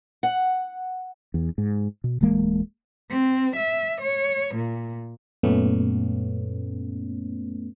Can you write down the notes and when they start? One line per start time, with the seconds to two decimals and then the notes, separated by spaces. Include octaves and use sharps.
0.23 F#5
1.34 E2
1.58 G#2
2.04 B2
2.21 D1 E3 G#3 A#3
3.11 C4
3.56 E5
4.01 C#5
4.55 A#2
5.43 F#2 A#2 A3 B3 C#4